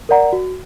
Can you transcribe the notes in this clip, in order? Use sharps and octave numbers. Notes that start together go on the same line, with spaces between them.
A#4 D5 F#5 A#5
F#4